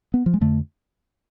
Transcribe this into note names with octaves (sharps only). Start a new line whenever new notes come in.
B3
F3
G#3
F2 D3 A3